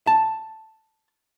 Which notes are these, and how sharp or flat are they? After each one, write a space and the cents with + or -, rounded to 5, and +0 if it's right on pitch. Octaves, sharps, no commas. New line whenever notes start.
A5 +5